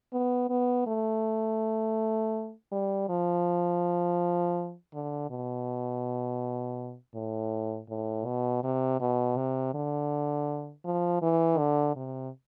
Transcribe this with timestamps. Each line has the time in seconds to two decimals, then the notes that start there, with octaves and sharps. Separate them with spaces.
0.13 B3
0.50 B3
0.87 A3
2.72 G3
3.09 F3
4.94 D3
5.30 B2
7.15 A2
7.89 A2
8.26 B2
8.63 C3
9.01 B2
9.37 C3
9.74 D3
10.85 F3
11.22 E3
11.58 D3
11.96 C3